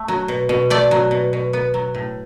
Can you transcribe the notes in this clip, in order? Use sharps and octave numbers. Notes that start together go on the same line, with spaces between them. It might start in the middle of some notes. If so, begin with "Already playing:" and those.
Already playing: A3
F#3
B2
B2
A3 D5
F#3
B2
B2
B3
F#3
A2